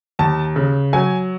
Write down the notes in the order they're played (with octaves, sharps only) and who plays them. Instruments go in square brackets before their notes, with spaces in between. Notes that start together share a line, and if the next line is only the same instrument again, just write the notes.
[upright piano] D#2 A5
C#3
F#3 G#5